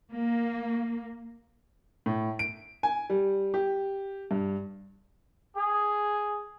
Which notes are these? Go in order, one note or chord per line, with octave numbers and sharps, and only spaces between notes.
A#3
A2
D7
G#5
G3
G4
G2
G#4